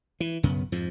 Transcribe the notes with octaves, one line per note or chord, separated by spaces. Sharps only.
E3
B1 F#2 C#3 B3
F2 G#2 F3